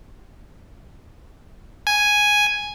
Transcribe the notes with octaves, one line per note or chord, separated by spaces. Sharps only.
G#5